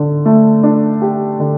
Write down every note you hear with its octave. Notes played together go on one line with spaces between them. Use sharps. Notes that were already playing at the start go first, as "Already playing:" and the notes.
Already playing: D3
A3
D4
G4
D3